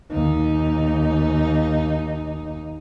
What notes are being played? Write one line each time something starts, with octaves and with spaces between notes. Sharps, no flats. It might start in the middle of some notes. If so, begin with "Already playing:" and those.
D#2 D#4